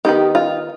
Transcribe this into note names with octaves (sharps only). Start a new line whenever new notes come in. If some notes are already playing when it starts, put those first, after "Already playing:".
D#3 B3 D#4 G4
F4